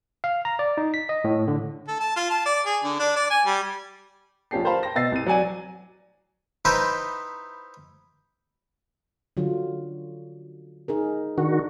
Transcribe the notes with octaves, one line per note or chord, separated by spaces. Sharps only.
F5
A#5
D5
D#4
B6
D#5
A2
D3
A4
A5
F4
A5
D5
G#4
D3
D4
D5
G#5
G3
A#1 F3 C#4 G4 A5 C7
A#4 C5 F5 A5 B5
G5 A#6
B2 D#5 E6 A6 C7
C2 D#7
F#3 D5 G#5 D#7
D#4 E4 G4 B4 C5 D#5
D3 F#3 F4
D#4 G#4 A#4
D#3 D4 F#4